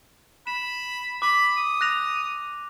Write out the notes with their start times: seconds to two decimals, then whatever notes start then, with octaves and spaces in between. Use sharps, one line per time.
0.47 B5 E7
1.22 B5 D6
1.57 D#6
1.81 F#6 A#6 F7